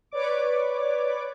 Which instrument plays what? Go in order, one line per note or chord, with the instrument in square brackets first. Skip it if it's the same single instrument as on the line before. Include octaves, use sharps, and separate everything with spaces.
[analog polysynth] B4 C#5 D5 D6